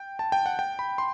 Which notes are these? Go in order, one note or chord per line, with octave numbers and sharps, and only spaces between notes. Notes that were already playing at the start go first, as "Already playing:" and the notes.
Already playing: G5
A5
G5
F#5
G5
B5
C6